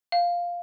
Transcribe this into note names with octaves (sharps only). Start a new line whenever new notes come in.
F5